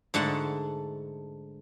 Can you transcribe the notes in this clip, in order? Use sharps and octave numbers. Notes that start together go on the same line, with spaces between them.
G#2 D3 A3 F#5 A5